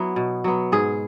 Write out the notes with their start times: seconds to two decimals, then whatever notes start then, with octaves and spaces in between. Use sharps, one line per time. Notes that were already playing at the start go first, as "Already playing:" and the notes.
Already playing: F#3 B3 E4
0.16 B2
0.44 F#3 B3
0.72 G#2 G#4